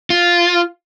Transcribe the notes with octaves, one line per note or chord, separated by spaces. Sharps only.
F4